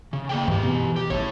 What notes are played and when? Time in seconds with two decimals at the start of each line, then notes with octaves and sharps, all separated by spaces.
0.13 C#3
0.29 A#3 G#4 G5
0.48 G2 E3 G4
0.63 B2 B3
0.96 G4
1.10 A1 A2 C#5